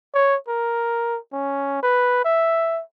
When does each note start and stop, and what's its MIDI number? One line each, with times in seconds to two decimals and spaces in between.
0.15 0.36 73
0.49 1.18 70
1.33 1.80 61
1.83 2.20 71
2.25 2.83 76